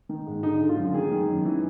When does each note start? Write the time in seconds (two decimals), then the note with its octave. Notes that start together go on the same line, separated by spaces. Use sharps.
0.09 D#3
0.27 G#2
0.43 D3 D#4
0.61 D3
0.69 F4
0.77 F#2
0.94 D#3 G#4
1.12 D#3
1.28 F#2
1.45 E3